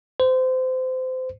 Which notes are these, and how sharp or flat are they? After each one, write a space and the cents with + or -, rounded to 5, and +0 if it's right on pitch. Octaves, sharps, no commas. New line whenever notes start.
C5 -25